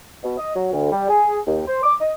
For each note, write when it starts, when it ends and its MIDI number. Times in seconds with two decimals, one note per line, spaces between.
0.24 0.34 47
0.37 0.54 75
0.56 0.71 54
0.72 0.90 38
0.92 1.07 55
1.09 1.38 68
1.46 1.60 39
1.66 1.80 72
1.83 1.95 86
2.01 2.14 75